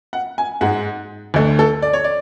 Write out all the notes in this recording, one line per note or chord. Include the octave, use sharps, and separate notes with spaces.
F#5
G#5
G#2 G#3 F#5
D2 D3 A3
A4
D5
C#5
D5